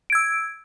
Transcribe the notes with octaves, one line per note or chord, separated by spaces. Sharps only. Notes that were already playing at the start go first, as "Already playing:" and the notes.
E6 G#6 D7